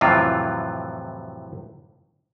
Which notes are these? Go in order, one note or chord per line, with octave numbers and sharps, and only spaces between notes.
F2 A2 C3 E3 F#3 F4